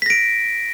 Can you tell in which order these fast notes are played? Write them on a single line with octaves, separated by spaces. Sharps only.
B6 A#6 D7